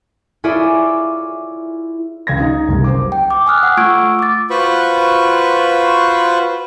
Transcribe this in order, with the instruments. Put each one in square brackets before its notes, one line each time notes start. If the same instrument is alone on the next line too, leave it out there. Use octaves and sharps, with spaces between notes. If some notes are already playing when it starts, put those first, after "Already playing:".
[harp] E4 F4 G#4 C#5 D5 E5
[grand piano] C#2 G#6 A#6
D#4
F#1 C2
C5 D6
[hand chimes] G5
D6
G#5 D#6 F6 F#6
F#5
A3 F4 C#6 E6 G#6 D7
D6 A6
[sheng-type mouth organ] F4 F#4 B4 C5 B5 C#6